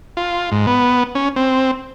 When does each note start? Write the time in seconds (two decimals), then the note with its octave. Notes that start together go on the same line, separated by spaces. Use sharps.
0.17 F4
0.52 G#2
0.67 B3
1.15 C#4
1.36 C4